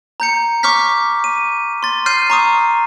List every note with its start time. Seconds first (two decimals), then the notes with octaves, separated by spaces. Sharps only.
0.20 A#5 G6 C#7
0.63 C#6 D6 F6 G6 B6
1.24 D#7
1.83 C6 A6
2.06 F6 G6 C7 D#7
2.30 A#5 C#6 D#6